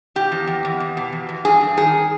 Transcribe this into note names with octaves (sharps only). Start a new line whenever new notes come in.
B2 G4
E2
E2
E2
E2
B2
E2
E2
G2 G#4
G2
D#3 G#4